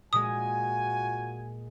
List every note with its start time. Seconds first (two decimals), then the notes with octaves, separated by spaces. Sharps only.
0.13 A#2 G#3 F4 F#4 G#5 D#6